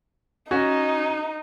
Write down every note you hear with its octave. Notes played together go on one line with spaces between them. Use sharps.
C#4 D#4 F#4